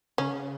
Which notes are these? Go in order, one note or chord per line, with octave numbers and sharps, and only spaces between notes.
C#3 C#4